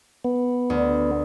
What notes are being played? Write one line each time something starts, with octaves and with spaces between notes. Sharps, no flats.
B3
D2